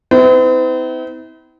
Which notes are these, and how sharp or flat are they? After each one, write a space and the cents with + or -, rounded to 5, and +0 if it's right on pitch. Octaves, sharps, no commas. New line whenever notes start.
C4 -45 E4 -40